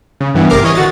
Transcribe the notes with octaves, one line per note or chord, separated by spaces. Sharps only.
C#3
G2 E3 B3
A1 C3 A#4 D6 F6 C7
E3 C#5 D#5
D3 F#4 A6